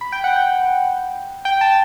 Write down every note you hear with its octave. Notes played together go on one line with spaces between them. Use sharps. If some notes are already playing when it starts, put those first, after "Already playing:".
B5
G5
F#5
G5
G5
A5